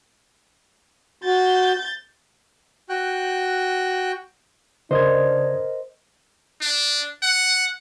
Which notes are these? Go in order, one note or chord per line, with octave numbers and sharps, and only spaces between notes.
F#4 G6 A6
F#4 G5 F#6
C#3 D4 A#4 C5 D#5 D#6 G#6
D4
F#5